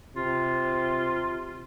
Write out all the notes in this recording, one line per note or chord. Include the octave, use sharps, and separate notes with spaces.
C3 F4